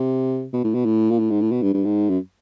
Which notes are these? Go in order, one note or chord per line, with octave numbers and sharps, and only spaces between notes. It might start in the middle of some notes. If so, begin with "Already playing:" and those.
Already playing: C3
B2
A2
B2
A2
A#2
A2
G#2
A2
B2
G2
G2
G#2
F#2